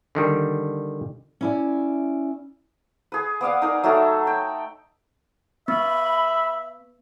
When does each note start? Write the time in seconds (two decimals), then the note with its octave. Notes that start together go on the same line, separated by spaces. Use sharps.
0.15 D3 D#3 G3
1.41 C#4 E4 D5
3.12 G#4 B4
3.41 B3 D5 F5 F#5
3.62 D#4 A#4 D5
3.84 F#3 A3 D#4 A4
4.27 G5
5.68 B3 E5 B5